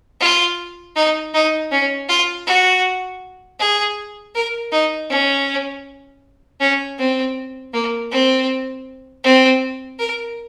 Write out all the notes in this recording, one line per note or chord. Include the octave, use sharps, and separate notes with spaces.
F4
D#4
D#4
C#4
F4
F#4
G#4
A#4
D#4
C#4
C#4
C4
A#3
C4
C4
A#4